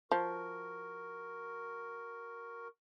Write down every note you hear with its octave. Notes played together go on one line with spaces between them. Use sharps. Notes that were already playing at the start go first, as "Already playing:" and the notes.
F3 F#4 A#4